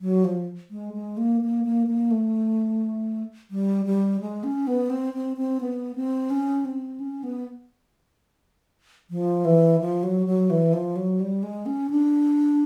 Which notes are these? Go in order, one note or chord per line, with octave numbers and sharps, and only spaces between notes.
F#3
F3
G#3
G#3
A#3
A#3
A#3
A#3
A3
G3
G3
G#3
C#4
B3
C4
C4
C4
B3
C4
C#4
C4
C#4
B3
F3
E3
F3
F#3
F#3
E3
F3
F#3
G3
G#3
C#4
D4